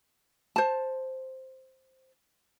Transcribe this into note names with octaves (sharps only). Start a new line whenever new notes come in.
C5 A5